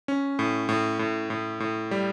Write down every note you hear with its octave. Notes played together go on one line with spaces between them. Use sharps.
C#4
A2
A2
A2
A2
A2
G3